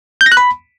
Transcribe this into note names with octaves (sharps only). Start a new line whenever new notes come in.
G6
A#6
F#6
B5